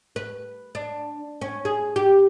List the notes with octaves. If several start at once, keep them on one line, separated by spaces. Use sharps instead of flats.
B4
D4
C#4
G#4
G4